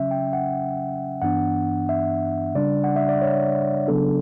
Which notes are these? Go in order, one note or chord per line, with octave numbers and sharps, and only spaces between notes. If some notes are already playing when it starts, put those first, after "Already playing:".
Already playing: C#3 F#3 C#4 E5
G5
F#5
G2 E3 B3 D4 F#5
E5
C#3 G3 D4 D5
F#5
E5
D5
C#5
C#3 F#3 B3 D4 A4